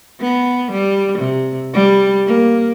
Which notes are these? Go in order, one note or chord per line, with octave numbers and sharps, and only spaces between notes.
B3
G3
C3
G3
A#3